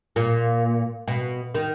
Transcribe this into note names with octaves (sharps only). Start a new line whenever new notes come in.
A#2
B2
D#3